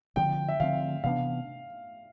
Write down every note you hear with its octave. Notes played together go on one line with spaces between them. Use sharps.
D3 F3 C4 G5
E5
D3 F3 C4 F5
C3 E3 B3 D4 F5